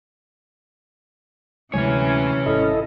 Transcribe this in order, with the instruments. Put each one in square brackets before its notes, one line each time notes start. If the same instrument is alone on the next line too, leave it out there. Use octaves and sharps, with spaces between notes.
[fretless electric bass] D2 F#3 G#3 [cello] C3 E3 [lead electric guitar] C#4 C#5 [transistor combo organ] G#5
[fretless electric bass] G#1 [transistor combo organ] E4 A4 D#5